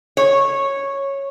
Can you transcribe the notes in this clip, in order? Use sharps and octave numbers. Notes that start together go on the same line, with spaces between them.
C#5